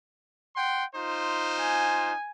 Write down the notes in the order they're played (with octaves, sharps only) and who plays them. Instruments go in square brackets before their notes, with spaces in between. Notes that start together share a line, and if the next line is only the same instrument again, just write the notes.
[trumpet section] F#5 G5 C6
D#4 F4 C5
[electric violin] G#5